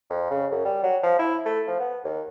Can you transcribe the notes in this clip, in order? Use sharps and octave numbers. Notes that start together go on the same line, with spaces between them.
F2
C#3
F#2
G3
F#3
F3
E4
A3
F3
B3
D#2